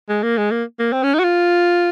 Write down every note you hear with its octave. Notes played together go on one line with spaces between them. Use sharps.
G#3
A#3
G#3
A#3
A#3
C4
C#4
D#4
F#4
F4